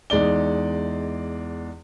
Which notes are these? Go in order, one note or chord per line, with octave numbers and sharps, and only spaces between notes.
E2 G#3 D#4 D5 G7